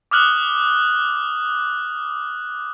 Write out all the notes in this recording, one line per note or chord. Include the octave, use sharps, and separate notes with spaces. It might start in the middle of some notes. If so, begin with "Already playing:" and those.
D6 D#6 F6 F#6 F#7